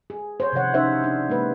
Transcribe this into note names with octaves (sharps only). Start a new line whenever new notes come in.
G#4
C5 C#5
C3 D#3 F3 C#5 F#5
C#4 D#4 C5 E5
D4
G#3 A#3 B4